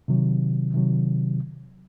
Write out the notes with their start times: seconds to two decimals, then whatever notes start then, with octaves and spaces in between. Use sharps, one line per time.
0.08 C3 D#3 F#3
0.74 C3 D#3 F#3